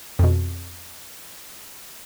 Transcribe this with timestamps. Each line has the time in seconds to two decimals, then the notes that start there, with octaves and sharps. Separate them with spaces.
0.19 F2 B2